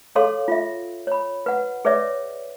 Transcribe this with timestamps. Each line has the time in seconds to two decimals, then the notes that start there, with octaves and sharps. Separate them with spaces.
0.15 G#4 A4 C#5 F5 C6
0.48 F4 E5
1.07 C#5 B5
1.46 B4 F#5
1.85 G#4 B4 C#5 D5 E5